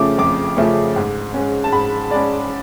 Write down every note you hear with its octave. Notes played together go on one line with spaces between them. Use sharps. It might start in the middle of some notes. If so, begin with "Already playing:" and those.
Already playing: F2 C#3 F3 A3 C#4 D6
F2 D6
C#3 F3 A3 C#4
G#2
G#3 C#4
A5
G#2 B5
G#3 C#4 D5